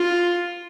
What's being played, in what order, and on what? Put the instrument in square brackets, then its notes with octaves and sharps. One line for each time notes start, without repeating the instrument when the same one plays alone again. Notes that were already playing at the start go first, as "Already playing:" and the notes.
Already playing: [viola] F4